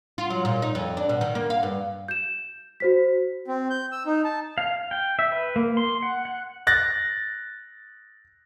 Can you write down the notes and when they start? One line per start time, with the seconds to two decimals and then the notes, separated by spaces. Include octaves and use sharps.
0.18 F4
0.30 F#3
0.45 A#2
0.62 D#4
0.75 F2
0.97 D4
1.09 B2
1.21 D#3
1.35 A#3
1.50 F5
1.63 G2
2.08 G6 E7
2.80 F#4 C5 B6
3.48 C4
3.70 G6
3.92 E6
4.06 D#4
4.24 A5
4.58 F5
4.91 G5
5.19 E5
5.32 B4
5.56 A#3
5.77 C6
6.03 F#5
6.25 F#5
6.67 F#6 A6 A#6